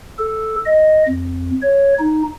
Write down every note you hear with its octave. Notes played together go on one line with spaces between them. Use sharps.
A4
D#5
F2
C#5
D#4